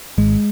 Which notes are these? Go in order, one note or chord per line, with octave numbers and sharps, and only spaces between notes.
G#1 G#3